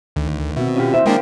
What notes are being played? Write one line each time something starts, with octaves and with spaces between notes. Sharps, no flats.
D2 D#3
B2 C4 F#4 E5
C#4 F4 G4
D#2 E4 C5 E5
G#3 A#3 D4 A#4 F5 G5